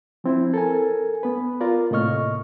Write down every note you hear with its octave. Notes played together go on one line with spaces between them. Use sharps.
F3 C4 E4
A4 A#4 G#5
B3 B4
F4 A#4 D5
A2 C3 A#3 D#5 C#6 F6